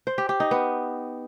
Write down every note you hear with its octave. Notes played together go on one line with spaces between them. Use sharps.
C5
G4
G4
D#4
B3